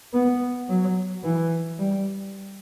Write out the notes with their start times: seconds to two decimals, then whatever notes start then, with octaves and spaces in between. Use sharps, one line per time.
0.14 B3
0.69 F#3
1.24 E3
1.79 G3